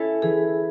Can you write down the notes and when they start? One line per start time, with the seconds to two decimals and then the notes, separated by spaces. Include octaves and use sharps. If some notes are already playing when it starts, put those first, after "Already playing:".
Already playing: C#4 E4 A4
0.22 E3 G#4